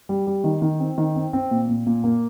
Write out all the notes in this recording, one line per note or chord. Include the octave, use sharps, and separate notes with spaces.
G3
G3
D#3
D#3
C4
D#3
C4
C4
A#2
A#2
A#2
A#3